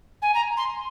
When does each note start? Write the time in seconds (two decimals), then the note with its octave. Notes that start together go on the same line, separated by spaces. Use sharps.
0.22 G#5
0.34 A#5
0.57 C6